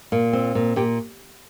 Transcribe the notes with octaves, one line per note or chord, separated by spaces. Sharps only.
A#2
C4
A#2
A#2 G4